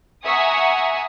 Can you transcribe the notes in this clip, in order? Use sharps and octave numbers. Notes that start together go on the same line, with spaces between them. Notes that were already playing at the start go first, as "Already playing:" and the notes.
E5 F#5 G#5 A#5 C#6 D#6